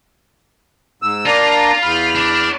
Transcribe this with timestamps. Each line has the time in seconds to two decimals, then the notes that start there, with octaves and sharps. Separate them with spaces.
1.02 G#2 E6
1.26 A#3 D4 F4 A#5
1.83 E2 B5 F6
2.15 D4 D5